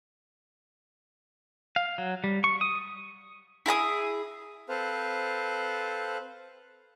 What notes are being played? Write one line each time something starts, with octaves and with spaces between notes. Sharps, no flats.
F5
F#3
G3
C#6
D#6
E4 G#4 A#5 D#6
C4 A4 B4 C5 F5